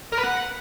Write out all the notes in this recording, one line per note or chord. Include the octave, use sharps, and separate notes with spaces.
A#4
B4
F#5